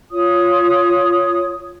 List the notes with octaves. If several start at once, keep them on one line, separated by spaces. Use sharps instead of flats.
F4 C#5 D#6